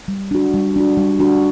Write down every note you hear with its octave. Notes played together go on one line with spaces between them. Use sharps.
G3
D4 F#4
G3
D4 F#4
G3
D4 F#4